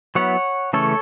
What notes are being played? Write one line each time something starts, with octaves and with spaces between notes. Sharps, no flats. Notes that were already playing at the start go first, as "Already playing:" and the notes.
F#3 B3 E4 C#5 F#5
C#3 E3 A3 C#4 A4 C#5